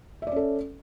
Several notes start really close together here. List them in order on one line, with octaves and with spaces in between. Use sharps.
E5 D5 C#4 A4